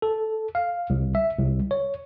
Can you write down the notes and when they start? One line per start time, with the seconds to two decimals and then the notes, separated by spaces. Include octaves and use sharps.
0.02 A4
0.55 F5
0.90 C2
1.15 E5
1.38 C2
1.71 C#5